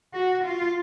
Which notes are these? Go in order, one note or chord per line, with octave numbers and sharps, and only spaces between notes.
F#4
F4